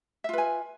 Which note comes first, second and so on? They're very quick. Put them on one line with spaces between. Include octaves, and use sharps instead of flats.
E5 F4 B4 G#5